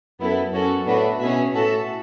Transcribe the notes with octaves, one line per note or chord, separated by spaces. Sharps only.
F#2 B3 E4 A4
F#2 C#4 F#4 A4
A2 B3 D4 F#4 B4 E5
B2 C#4 G#4 B4 E5
A2 F#4 A4 E5 A5